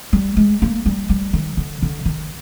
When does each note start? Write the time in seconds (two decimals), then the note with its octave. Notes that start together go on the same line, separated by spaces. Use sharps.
0.13 G3
0.37 G#3
0.62 A#3
0.86 G3
1.09 G3
1.33 D#3
1.57 D3
1.82 D3
2.05 D#3